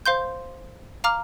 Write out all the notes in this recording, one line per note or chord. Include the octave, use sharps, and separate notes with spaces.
C5 F5 C6 G6
F5 A#5 D6 F6